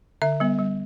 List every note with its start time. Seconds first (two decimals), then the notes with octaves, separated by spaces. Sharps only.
0.22 D3 E5
0.40 G3 B3
0.58 G3